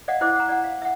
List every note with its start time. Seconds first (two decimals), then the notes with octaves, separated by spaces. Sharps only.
0.08 D5 D#5 F5 F#5
0.21 E4 C5 F#5 D6
0.36 F#5 A#5
0.49 D5 F#5
0.64 F5
0.82 E5 F#5